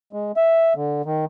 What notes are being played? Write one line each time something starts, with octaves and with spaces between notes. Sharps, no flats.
G#3
E5
D3
D#3